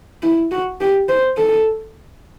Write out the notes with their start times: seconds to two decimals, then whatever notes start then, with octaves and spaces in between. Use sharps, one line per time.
0.23 E4
0.52 F#4
0.81 G4
1.09 C5
1.37 A4